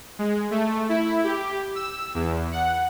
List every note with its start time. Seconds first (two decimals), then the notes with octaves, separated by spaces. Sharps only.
0.19 G#3
0.51 A3
0.89 E4
1.24 G4
1.75 E6
2.15 E2
2.52 F#5